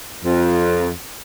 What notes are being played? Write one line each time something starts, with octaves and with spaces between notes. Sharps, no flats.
F2